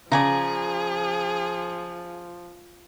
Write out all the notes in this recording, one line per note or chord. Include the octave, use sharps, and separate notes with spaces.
C#3 F3 G#4 D5 G#5 A#5